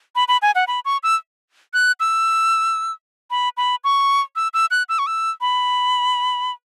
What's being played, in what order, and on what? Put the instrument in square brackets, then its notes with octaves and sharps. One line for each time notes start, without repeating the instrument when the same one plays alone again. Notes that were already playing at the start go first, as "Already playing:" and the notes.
[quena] B5
B5
G#5
F#5
B5
C#6
E6
F#6
E6
B5
B5
C#6
E6
E6
F#6
E6
C#6
E6
B5